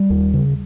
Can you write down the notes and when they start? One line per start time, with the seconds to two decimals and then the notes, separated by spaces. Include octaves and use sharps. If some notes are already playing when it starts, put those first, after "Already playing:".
Already playing: G3
0.10 D#2
0.34 C#3